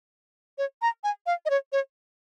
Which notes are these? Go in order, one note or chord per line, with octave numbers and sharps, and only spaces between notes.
C#5
A#5
G#5
F5
D#5
C#5
C#5